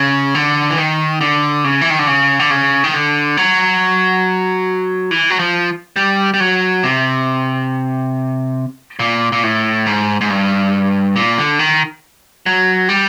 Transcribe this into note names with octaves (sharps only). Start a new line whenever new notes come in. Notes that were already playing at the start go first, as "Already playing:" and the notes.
Already playing: C#3
D3
E3
D#3
D3
C#3
E3
D#3
D3
C#3
D3
C#3
D#3
D3
F#3
E3
F#3
F3
G3
G3
F#3
C3
A#2
A#2
A2
G#2
G#2
G2
A#2
D3
D#3
F#3
G3